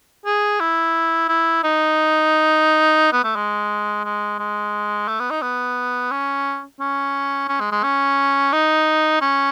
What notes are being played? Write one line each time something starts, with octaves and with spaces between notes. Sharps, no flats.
G#4
E4
E4
D#4
B3
A3
G#3
G#3
G#3
A3
B3
D#4
B3
C#4
C#4
C#4
G#3
G#3
C#4
D#4
C#4